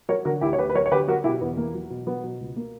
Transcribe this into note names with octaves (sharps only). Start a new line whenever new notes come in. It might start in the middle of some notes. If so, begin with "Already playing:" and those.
F#3 A#4 C#5
D3 F#4 A#4
D2 E4 G4
C#5
D2 G4 B4
B4
F#3 A#4 C#5
C#5
D3 G4 B4
F#3 F#4 A#4
B2 E4 G4
E2 B3
E2 A#3
F#3
B2
F#3 B3
B2
C#2
A#3